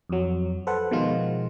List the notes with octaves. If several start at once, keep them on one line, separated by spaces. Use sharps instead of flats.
F2 F#3
A4 B4 C5 F#5
B2 D#3 F3 G#3 F4